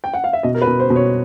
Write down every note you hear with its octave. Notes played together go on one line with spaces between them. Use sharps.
G5
F#5
F5
E5
B2 D#5
A#4
B4
B2
C5
B2
C#5